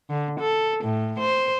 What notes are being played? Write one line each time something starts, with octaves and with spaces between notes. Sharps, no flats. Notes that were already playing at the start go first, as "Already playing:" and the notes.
D3
A4
A2
C5